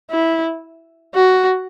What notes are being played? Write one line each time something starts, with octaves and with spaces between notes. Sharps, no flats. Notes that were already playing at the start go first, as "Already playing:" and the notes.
E4
F#4